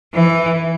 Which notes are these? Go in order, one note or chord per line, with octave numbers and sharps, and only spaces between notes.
E3